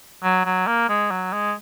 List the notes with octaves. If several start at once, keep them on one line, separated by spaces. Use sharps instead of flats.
F#3
F#3
A#3
G#3
F#3
G#3